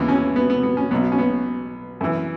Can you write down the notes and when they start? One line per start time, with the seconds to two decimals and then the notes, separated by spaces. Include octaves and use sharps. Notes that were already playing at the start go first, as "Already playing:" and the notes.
Already playing: D#2 C#3 E3 B3
0.09 C#4
0.36 B3
0.50 B3
0.63 B3
0.77 C#4
0.91 B1 B2 F#3 B3
1.12 C#4
1.18 B3
2.01 F#2 E3